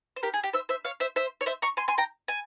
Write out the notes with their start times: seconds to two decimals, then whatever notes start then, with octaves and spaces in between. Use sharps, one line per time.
0.16 C5
0.23 G4 A#4
0.34 G#4
0.44 G4
0.53 C5 E5
0.69 C5 E5
0.85 C#5 F5
1.00 C5 E5
1.16 C5 E5
1.41 C#5
1.46 C5 E5
1.62 A#5 C#6
1.77 G#5 C6
1.88 G#5 C6
1.98 G5 A#5
2.28 G#5